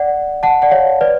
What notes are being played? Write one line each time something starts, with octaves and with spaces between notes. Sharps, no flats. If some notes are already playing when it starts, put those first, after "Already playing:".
Already playing: D5 F#5
F#5 A5
D5 F#5
C#5 F5
B4 D5